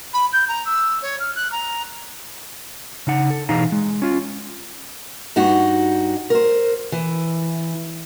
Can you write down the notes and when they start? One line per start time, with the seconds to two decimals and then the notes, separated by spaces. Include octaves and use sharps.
0.13 B5
0.32 G6
0.48 A#5
0.65 E6
1.02 C#5
1.19 F6
1.35 F#6
1.52 A#5
3.07 C#3 D#4 F#5
3.30 A4
3.49 B2 E3 D#4 G#4 F5 A#5
3.72 G#3
4.02 C#4 F4
5.36 G2 D#4 F#4
6.30 A#4 C5
6.92 E3